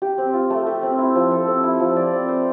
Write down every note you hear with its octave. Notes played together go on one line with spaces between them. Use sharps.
G4
C4
F4
A3
G4
C4
E4
F3
A4
C4
E4
F3
D5
C4
C5